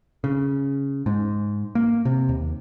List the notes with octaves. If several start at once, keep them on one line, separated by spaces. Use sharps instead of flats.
C#3
G#2
A#3
C3
D#2